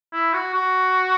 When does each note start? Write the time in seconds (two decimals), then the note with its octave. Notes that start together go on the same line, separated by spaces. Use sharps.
0.13 E4
0.34 F#4
0.54 F#4